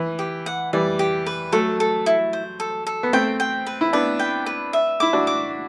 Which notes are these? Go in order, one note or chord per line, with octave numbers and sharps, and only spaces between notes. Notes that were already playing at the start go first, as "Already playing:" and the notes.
Already playing: E3
G4
F#5
E3 G3 D5
G4
B4
F#3 A3 A4
A4
E4
C5
A4
A4
B3
A3 C4 G5
G5
B4
E4
B3 D4 B4
G5
B4
E5
E4 D6
D4 F#4
D6